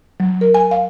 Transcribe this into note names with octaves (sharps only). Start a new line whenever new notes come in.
F#3
A#4
G#5
F5